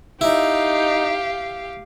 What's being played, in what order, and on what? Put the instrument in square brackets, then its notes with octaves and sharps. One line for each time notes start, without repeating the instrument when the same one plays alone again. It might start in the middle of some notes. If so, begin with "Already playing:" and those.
[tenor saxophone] D#4 [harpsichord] E4 [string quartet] G4 F5